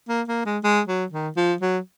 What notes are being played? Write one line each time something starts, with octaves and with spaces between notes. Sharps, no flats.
A#3
A#3
G#3
G#3
F#3
D#3
F3
F#3